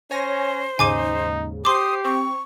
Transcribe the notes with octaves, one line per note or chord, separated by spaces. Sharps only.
C#4 C5 C#5 G#5 A#6
D#2 G#2 C#3 D#4 G#5 D6 D#7
G4 C5 C6 D6 D#6 C7
C4 C#6